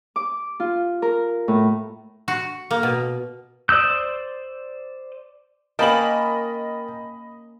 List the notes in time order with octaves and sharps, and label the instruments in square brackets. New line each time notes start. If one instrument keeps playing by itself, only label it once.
[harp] D6
F4
A#4
A2
[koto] F#4
A#3
B2
[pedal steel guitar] C5 D5 D#6 E6 G6
[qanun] A#3 C#4 [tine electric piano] A#4 G5 A5 [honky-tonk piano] D#5 B5 F#7